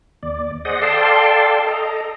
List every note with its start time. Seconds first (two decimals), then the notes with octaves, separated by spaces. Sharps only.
0.23 D#2 D5
0.65 G#4 C5 D5 D#5 F#5 D#6
0.82 A4 D5 F5 G5 A5 C6
1.67 A4 D#5 A#5